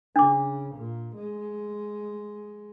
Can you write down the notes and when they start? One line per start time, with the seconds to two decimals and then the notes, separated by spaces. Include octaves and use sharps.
0.16 C#3 D4 D6
0.75 A#2
1.16 G#3